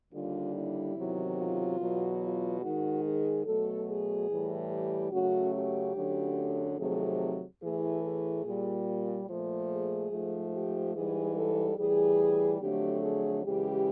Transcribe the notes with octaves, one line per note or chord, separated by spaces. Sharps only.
D#2 D3 G3 F4
E4
E2 C3 D#3 F#3
F4
E2 B2 F#3
F4
G#2 D#3 G#3 F#4
G#4
B2 F#3 A3 A4
G#4
A2 E3 G3
G4
F#2 C#3 F#3 A3 F#4
G4
F#2 D3 F#3 A3
F2 C3 D#3 F#3 A3 G#4
A2 E3 A3 G#4
G#4
A#2 G3
A#2 F3 A3
G#4
G#2 F3 A3
G4
G#2 E3 G3 G#4
A4
A2 E3 G3 G#4
F2 D3 F#3 A3 G4
G#4
F#2 C#3 E3 G#3 G4